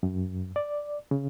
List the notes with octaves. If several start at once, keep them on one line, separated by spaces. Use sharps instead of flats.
F#2
D5
C#3